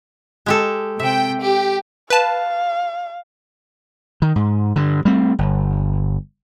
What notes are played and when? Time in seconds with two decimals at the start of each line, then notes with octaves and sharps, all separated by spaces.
0.46 G#3 G4 A4
0.99 C3 E5 G5
1.42 G4
2.10 B4 F5 A5
4.22 D#3
4.36 G#2
4.76 G2 D3
5.05 G3 A3 C4
5.39 G1